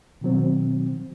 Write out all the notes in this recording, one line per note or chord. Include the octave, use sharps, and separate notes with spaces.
B2 D#3 F#3 C4